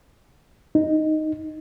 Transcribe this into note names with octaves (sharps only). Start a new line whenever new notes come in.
D#4